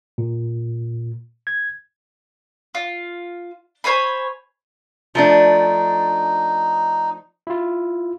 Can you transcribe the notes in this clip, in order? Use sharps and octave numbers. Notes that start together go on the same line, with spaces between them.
A#2
G#6
F4
C5 C#5 G#5 B5
F3 A3 D4 D#4
E4 F4